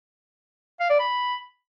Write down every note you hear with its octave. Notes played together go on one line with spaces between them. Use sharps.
F5
D5
B5